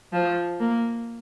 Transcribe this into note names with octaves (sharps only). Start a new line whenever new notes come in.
F3
A#3